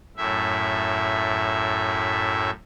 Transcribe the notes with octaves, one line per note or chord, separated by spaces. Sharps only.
F#2 A2 E5